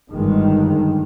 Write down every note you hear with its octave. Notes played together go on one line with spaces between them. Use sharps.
G1 G2 D#3 G#3